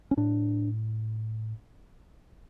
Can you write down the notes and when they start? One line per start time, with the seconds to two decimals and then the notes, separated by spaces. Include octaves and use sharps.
0.11 C#4
0.17 A2 D4